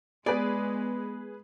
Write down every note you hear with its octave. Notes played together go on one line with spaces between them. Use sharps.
G#3 B3 G#4 B4 D5